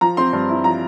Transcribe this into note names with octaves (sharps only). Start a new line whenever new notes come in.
F3 A#5
C4 C6
G2
E4
F3 A#5